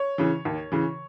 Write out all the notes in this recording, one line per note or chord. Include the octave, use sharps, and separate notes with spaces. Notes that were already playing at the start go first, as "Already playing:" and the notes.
Already playing: C#5
C#3 E3
D#2
C#3 E3